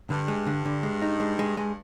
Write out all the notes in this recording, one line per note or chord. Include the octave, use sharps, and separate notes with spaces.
G2 D3
G#3
D3
D3
G#3
D#4
G#3
G#3
G2 G#3